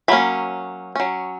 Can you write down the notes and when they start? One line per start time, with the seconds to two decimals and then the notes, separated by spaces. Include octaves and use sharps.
0.08 F#3 A#3 C#4 B5
0.96 F#3 C#4